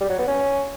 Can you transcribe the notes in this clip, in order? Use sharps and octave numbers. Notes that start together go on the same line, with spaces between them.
G3
F#3
B3
C#4